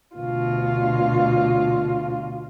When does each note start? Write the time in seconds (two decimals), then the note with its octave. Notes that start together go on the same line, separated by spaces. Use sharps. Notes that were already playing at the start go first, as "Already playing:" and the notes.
0.16 D2 B2 F4